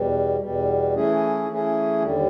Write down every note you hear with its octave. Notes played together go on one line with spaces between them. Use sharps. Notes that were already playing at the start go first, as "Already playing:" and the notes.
Already playing: E2 B2 G3
E2 B2 G3
E3 A3 C#4 E4 G#4
E3 A3 C#4 E4 G#4
D#2 D3 G3